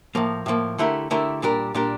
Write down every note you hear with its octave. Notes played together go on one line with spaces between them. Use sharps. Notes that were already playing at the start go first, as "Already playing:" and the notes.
A2 F3 A#3
A2 F3 A#3
D3 A3 E4 G4 A#4
D3 A3 E4 G4 A#4
A#2 G3 D4 G4 A#4
A#2 G3 D4 G4 A#4